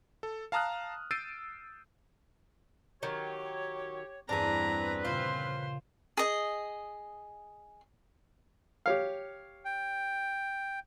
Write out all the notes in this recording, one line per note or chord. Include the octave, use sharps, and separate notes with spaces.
A4
F5 A5 A#5 D#6 F6 F#6
E6 G6 A6 C7 D7 D#7
D#3 F#3 G4 C#5
E2 G2 C4 D4 G#4 B4 A#5
A#2 C#3 F4 C5
G#4 D#5
G4 C#5 F5
G5